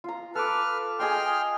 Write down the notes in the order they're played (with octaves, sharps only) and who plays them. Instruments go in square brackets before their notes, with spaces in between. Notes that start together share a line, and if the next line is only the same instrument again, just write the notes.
[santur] F4 A#5
[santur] A4 D6 [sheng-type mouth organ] B4 F6
[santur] G#4 D#5 G#5 [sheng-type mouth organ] G5 C6 F6